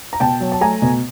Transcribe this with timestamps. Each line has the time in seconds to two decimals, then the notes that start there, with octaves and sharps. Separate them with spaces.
0.13 A#5
0.20 B2 G5 A5
0.40 F#3
0.52 A5
0.61 A3 G#5 A#5
0.82 B2